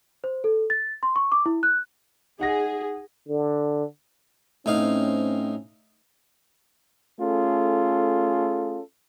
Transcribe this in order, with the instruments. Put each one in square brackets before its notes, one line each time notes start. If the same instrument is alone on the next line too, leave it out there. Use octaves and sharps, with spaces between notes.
[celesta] C5
A4
A6
C6
C#6
D6
E4
F#6
[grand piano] D#4 F#5 A#6 [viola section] G#4
[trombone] D3
[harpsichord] A2 D#4 F5 [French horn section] C4 C#4
[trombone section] A3 C#4 F4 G#4 A4